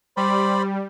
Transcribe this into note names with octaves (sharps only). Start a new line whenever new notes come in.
G3 C5 D5 B5